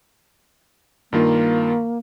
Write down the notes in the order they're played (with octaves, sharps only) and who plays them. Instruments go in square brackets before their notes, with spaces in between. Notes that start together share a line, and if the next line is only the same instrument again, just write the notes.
[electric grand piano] G2 D#3 F4 [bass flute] A#3